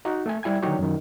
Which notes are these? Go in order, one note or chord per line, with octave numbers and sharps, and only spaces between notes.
D#4 F#4
A3 A4 G#5
G3 E4 G#5 G#6
D3 D#3 F#3 D#4 G4 C#5
F#2 D#3